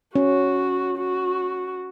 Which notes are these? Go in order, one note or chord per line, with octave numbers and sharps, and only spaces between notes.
C#4 F#4
F#4